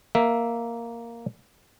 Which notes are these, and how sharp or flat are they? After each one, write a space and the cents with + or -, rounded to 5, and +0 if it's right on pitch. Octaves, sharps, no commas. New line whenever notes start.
A#3 +0 E5 +0